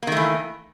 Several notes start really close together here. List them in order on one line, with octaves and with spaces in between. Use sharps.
A#3 D#3 A3 E3